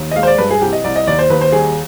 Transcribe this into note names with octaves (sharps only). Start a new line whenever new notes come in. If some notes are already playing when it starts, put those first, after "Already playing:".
Already playing: D#2
D#5
G#3 F5
C5
D5
G2 B4
G#4
C2 G4
D#5
C2 D5
D#5
D#2 D5
C5
D#2 B4
C5
G3 G#4